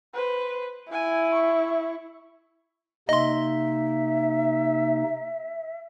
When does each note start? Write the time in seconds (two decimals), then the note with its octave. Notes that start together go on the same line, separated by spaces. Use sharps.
0.14 B4 C5
0.92 E4 G#5
1.33 C#6
3.09 C3 A#3 D#4 D#5 E5 C6